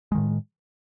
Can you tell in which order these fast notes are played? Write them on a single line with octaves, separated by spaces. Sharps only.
G#3 D#3 A2